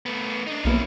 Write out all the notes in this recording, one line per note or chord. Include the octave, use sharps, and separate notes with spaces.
A3 B3
D4 D#4
B1 A#3 B3 C#4 E4